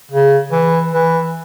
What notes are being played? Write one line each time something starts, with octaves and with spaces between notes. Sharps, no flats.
C#3
E3
E3